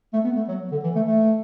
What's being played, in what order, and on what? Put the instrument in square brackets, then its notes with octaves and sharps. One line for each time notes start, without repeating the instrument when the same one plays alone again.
[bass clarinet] A3
B3
A3
F#3
D3
E3
A3
A3